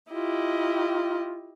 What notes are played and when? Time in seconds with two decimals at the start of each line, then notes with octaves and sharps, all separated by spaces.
0.13 E4 F4 G4 D#5